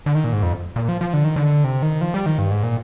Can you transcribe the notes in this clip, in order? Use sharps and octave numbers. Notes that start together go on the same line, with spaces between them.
D3
D#3
A#2
G#2
F2
A#2
F3
F3
D3
D#3
D3
C3
D#3
F3
G3
D#3
G2
G#2
A#2